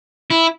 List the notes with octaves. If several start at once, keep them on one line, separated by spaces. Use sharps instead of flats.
E4